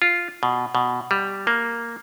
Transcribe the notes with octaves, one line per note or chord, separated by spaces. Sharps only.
F4
B2
B2
G3
A#3